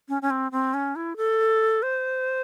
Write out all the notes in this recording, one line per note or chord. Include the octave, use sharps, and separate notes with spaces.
C#4
C#4
C4
C4
C#4
E4
A4
C5